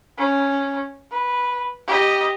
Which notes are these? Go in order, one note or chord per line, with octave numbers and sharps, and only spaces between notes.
C#4
B4
G4 D#5